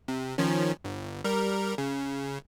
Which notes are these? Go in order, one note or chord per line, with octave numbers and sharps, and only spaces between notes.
C3
D#3 F3 C#4
G1
G3 A#4
C#3